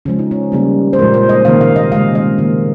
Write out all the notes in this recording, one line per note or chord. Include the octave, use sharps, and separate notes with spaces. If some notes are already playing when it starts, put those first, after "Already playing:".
C#3 F3 G#3 C#4
D#4
C#4
C#3 G3 A#3
C5
A#2 F3 G#3 A#4
C5
D#5
C3 D#3 A#3 F5
F5
D#5
C#3 G#3 F5
D#5
D#3 A#3